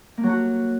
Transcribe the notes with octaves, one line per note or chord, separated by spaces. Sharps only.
A#3
F#3
F#4